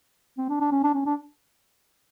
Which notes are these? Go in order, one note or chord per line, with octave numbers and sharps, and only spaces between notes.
C4
D4
D4
C#4
D4
C#4
D4